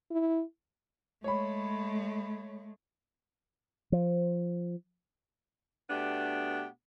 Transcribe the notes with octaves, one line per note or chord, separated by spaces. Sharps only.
E4
G#3 A3 C#5 B5
F3
B2 A3 B3 D4 G4